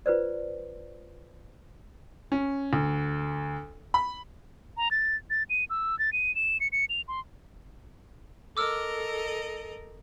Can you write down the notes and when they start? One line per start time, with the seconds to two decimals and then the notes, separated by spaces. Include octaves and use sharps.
0.06 F4 B4 C5 D5
2.32 C#4
2.73 D2
3.94 B5
4.77 A#5
4.91 A6
5.30 A6
5.50 D#7
5.70 E6
5.99 A6
6.13 D#7
6.35 E7
6.60 C#7
6.72 C#7
6.90 F7
7.08 C6
8.57 A4 A#4 D#5 D6 E6 F6